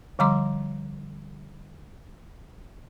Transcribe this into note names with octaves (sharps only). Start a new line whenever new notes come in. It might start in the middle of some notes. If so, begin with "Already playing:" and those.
D3 F3 G3 A#5 C6 D6